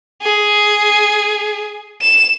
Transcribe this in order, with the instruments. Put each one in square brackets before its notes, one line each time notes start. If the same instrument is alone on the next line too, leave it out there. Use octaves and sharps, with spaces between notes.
[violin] G#4
E7